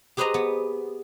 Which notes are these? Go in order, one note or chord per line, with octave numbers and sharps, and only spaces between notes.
G4 G#4 B4 C5 D#5 A#5
B3